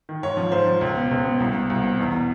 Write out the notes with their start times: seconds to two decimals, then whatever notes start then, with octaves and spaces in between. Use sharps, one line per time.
0.09 D#3
0.23 G#2 C#5
0.37 F3
0.52 G#2 C5
0.67 F3
0.81 C#2
0.96 B2
1.11 C#2
1.25 B2
1.40 C2
1.55 B2
1.70 C2
1.84 B2
1.99 E2
2.13 B2